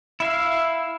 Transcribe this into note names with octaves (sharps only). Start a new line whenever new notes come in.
E4 E5 F5